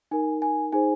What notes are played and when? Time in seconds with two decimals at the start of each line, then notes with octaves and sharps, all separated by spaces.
0.11 D#4 A#4 G#5
0.42 G#5
0.72 D#4 G#4 C5 G#5